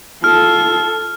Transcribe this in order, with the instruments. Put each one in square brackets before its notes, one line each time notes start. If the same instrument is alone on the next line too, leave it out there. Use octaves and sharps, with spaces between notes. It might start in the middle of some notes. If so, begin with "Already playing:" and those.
[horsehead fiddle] F4 A4 [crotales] F6